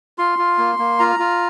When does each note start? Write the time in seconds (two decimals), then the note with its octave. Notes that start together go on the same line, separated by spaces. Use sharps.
0.18 F4 C6
0.38 F4
0.58 A#3
0.79 A#3
0.99 F4 A#5
1.19 F4